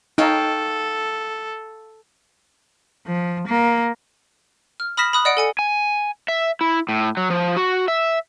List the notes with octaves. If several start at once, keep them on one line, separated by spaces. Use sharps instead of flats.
D#4 A4 C#5 F5 G5
F3
A#3
F6
B5 D#6 F6 A#6 B6 E7
B5 D#6 F#6
D5 D#5 F#5 D#6 D7
A4 G#5 C#7
G#5
E5
E4
A2
F#3
F3
F#4
E5